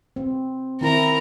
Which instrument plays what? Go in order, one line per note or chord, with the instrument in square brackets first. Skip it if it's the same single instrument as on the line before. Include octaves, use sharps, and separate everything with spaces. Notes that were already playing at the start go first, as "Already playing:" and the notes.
[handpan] C4
[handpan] D#3 C4 E4 [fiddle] A#4 A#5